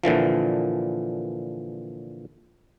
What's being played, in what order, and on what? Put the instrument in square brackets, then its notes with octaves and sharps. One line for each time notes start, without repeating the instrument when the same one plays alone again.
[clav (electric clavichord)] A#2 D3 E3 F3